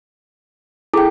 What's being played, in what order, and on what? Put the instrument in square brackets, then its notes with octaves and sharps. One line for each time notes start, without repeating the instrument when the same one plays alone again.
[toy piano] E4 G#4 G#5 [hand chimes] A4 G5